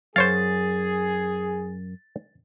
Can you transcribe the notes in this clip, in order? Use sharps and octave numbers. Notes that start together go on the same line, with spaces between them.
F#2 G#4 C5 C#5 F5 A6